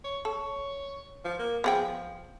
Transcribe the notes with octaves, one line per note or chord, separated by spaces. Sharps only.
C#5
A4 C#5
F3
A#3
F3 B3 G#4 G5